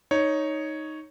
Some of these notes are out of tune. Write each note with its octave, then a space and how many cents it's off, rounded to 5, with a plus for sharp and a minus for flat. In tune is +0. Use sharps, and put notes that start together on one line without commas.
D#4 +0 C#5 +0